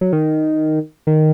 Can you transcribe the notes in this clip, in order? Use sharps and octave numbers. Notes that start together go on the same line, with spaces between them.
F#3
D#3
D#3